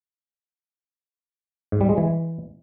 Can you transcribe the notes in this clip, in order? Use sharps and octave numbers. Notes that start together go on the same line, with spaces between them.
G#2
G3
G#3
E3